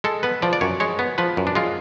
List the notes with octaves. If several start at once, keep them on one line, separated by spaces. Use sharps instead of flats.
G#3 A4
B3 B4
F3 D5
D5
F#2 C#5
G#3 C#5
B3
F3 B4
F#2
D4
G#3 F4